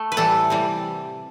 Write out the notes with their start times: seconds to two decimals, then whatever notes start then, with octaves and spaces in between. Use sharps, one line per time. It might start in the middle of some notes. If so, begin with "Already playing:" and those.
Already playing: A3
0.12 B4
0.17 A2 E3 G3 A4
0.50 C3 E3 G3